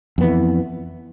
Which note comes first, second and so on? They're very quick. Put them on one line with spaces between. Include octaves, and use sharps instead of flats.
F2 B3 E3